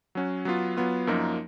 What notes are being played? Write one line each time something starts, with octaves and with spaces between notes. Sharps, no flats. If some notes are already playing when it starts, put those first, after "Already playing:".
F#3 C#4 F#4
F#3 B3 F4
F#3 B3 F4
F#2 F3 A#3 D#4